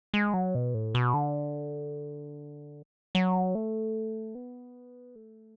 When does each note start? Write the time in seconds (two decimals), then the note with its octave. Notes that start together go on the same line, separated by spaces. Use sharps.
0.14 G#3
0.34 F#3
0.55 B2
0.74 A2
0.95 B2
1.14 D3
3.15 F#3
3.55 A3
4.35 B3
5.15 A3